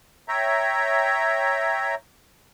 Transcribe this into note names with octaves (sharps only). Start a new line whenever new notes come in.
C#5 E5 G5 A#5